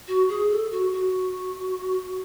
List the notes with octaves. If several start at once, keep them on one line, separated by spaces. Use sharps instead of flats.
F#4
G#4
A4
F#4
F#4